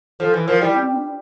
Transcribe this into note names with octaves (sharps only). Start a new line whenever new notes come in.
F3 A4
E3
F3 A#4
G3 E4
C4
C4
D4